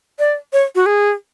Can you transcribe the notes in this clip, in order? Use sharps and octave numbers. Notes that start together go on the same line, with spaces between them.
D5
C#5
F#4
G#4